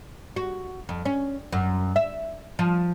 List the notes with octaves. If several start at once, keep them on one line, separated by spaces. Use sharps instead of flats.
F#4
F2
C#4
F#2
E5
F3